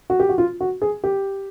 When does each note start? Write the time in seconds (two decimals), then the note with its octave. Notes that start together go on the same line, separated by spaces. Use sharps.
0.10 F#4
0.20 G4
0.29 F#4
0.38 F4
0.60 F#4
0.82 G#4
1.04 G4